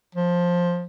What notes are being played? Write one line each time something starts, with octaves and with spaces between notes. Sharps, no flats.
F3